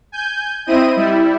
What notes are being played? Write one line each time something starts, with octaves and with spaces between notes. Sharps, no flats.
G#5 G6
C4 E4 D#5 D#7
G3 E4